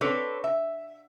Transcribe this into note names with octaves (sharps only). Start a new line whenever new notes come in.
C4 D4 A4 B4 C#5
E5